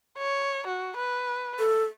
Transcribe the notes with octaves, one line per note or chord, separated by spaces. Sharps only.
C#5
F#4
B4
A4